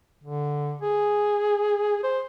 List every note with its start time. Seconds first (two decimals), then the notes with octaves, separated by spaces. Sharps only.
0.24 D3
0.82 G#4
2.04 C5